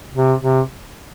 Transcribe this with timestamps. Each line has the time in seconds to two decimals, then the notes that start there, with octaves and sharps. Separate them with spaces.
0.15 C3
0.42 C3